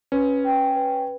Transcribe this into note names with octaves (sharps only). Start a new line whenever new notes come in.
C#4 B4
G5
B4